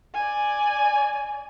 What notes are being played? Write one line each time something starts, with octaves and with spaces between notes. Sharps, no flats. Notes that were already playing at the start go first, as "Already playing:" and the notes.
D5 G#5